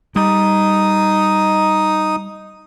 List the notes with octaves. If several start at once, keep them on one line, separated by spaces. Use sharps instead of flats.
G3 D#4 D#6